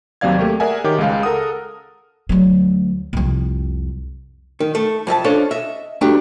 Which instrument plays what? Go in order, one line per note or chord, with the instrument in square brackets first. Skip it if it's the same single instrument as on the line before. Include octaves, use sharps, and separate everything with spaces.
[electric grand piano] D#2 C3 F#3 D5 F5 G#6
A3 A#3 G4 C#6
G#4 A#4 D5 E5 F#5 G#5
D#3 G4 C#5 D6
C#2 C#3 G#3 F5
A4 A#4 F#5 D#6
[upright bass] D2 F#3
C2 F2
[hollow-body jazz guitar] D#3
A3
F2 D#5 E5 A5
C#4 D4 F4 A4 C5
D#5 E5
F#3 A3 D4 G4